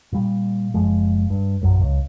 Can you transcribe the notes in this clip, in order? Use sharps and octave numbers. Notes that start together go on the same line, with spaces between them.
A#2 G3
F#1 F3 G#3
G2
A#1 F#2 F#3
C#2